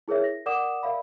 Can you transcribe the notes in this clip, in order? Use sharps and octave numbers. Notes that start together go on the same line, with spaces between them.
E4 G#4 A#4 C#5 E5
A#6
A#4 D5 F#5 D6 D#6 E7
A#4 D5 E5 F5 B5